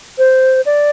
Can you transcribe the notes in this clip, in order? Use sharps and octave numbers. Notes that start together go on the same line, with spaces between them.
C5
D5